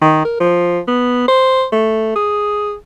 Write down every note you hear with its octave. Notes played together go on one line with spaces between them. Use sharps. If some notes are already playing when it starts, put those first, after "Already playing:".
D#3
A#4
F3
B3
C5
A3
G#4